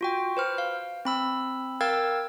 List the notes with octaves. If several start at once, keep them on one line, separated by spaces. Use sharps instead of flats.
F4 F#4 G5
B4 C5 F6
F5
C4 B5 E6
A#4 F5 G5 E6 G#6 A6